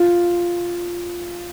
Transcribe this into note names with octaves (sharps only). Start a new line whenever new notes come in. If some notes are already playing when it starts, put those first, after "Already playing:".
Already playing: F4